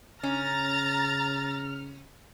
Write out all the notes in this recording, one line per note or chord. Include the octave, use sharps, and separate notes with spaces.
C#3 C#4 A#5 F6 A6